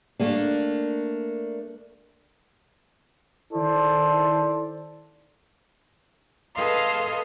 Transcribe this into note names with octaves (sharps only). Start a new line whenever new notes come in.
A3 A#3 D4
D#3 E4 A4 C5 D5
G#4 A4 B4 D#5 F5 C6